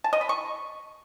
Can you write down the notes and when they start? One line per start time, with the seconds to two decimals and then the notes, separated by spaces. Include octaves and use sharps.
0.04 A5
0.13 D#5
0.21 B5
0.29 C#6